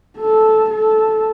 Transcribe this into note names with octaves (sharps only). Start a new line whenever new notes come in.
A4
A4